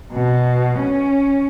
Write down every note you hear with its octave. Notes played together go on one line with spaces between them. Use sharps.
B2
C#4